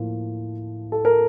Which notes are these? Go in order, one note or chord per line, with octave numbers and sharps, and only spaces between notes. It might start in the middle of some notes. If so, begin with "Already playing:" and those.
Already playing: A2 F3 A#3 F4
A4
A#4